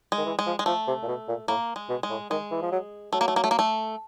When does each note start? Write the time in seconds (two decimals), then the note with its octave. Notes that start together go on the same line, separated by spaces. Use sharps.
0.12 G#3
0.18 D#3
0.26 E3
0.39 G#3
0.46 F3
0.59 G#3
0.66 F3 A3
0.88 C3
1.03 A#2
1.08 B2
1.28 A#2
1.48 A2 A#3
1.76 G#3
1.89 B2
2.03 G#3
2.10 A2
2.30 D#3 G#3
2.51 E3
2.62 F3
2.72 F#3
3.12 F#3 A3
3.21 A#3
3.28 A3
3.36 A#3
3.44 A3
3.51 A#3
3.59 A3